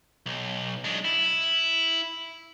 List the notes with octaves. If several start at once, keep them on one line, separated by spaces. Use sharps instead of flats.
B1
G#3 D4
E4